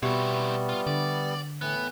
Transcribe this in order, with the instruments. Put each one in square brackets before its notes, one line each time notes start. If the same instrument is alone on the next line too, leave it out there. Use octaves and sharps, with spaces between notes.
[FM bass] B2 [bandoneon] G3 B3 [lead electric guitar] C4 E4 [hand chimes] G4 E5 C#6
[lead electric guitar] F4
[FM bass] D3 [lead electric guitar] D5
[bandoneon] A2 E3 [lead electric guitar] B3